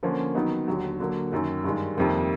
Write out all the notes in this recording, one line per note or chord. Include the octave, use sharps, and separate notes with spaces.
D3 F3 A#3 C#4
D#3 F#3 B3 D#4
D#2 D3 F#3
D3 F#3 A#3
F#2 D#3 F#3
G2 D#3 G#3
F2 C3 D#3 G3 A#3